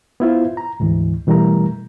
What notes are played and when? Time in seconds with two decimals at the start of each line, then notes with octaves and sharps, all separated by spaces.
0.20 B3 E4 F4 C5
0.57 A#5
0.80 D2 G#2 E3
1.27 B2 E3 G3 A3 A#4 A#5